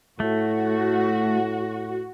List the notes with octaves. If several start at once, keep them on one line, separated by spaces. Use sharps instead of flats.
A2 A3 F#4